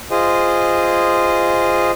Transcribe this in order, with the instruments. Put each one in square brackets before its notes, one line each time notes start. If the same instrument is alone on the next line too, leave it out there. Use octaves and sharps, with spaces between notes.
[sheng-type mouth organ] F4 G#4 C5 D#5